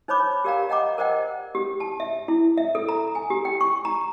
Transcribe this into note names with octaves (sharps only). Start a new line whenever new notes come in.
D#4 C5 C#5 B5 D6
G4 A#4 D5 F5 G5 A#5
D#5 F#5 G5 A#5 D6
A#4 C5 D5 D#5 F#5 G5
G4
A5
E5
E4
E5
A4
A#5
G#5
G4
G5
C#6
A#5